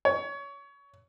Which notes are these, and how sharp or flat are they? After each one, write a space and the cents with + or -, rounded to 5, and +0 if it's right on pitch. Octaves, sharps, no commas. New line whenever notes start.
C#5 +25